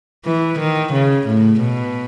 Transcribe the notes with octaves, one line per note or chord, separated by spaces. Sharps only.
E3
D#3
C#3
A2
B2